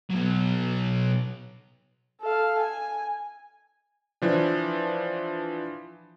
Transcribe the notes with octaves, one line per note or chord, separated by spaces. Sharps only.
B2 F#3
A4 F5
G#5
E3 F3 D4